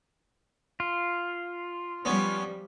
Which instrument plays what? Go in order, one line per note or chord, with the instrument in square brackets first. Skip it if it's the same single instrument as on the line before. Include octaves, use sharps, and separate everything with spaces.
[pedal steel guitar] F4
[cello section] F3 G3 [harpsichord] B3 C#4